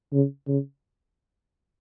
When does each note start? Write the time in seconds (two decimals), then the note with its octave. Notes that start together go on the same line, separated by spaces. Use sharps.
0.13 C#3
0.48 C#3